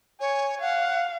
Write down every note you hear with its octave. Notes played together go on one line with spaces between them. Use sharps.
C#5 G#5
F5 F#5